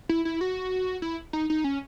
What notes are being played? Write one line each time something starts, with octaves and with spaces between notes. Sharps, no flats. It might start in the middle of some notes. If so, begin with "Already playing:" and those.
E4
E4
F#4
E4
D#4
D#4
C#4